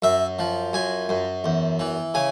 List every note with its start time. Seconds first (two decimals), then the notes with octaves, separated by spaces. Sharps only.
0.02 F#2 E5
0.39 F3
0.73 F#2 G#5
1.09 F#2
1.44 E2
1.79 E3
2.14 C#3 G#5